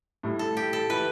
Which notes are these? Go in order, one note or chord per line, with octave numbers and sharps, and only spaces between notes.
A2 G3 E4
A4
G4
A4
E3 A3 E4 B4